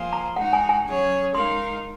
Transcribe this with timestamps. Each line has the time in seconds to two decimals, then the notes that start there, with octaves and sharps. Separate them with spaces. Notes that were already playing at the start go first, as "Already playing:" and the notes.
Already playing: F3 A#3 F4 G#4 C5
0.13 A#5
0.36 G#3 D#4 F#4 F#5
0.53 G#5
0.69 G#5
0.85 F#3 C#4 G#4 C#5
1.35 G#3 D#4 A#4 F5 C6